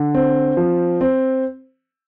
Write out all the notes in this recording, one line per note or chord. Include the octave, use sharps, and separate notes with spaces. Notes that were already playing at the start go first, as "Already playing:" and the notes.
Already playing: D3
C4
F3
C4